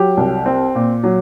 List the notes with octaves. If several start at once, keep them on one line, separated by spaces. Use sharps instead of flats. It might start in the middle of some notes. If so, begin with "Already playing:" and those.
Already playing: F#3 G4
C2
C4
A#2
F#3